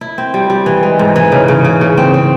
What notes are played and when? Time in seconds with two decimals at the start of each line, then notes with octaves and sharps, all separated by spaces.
0.01 E4
0.18 C4
0.34 G3
0.50 G3
0.66 E3
0.83 G#3
0.99 G#2
1.16 E3
1.32 C#3
1.48 C#3
1.65 C#3
1.81 C#3
1.97 C4
2.14 C4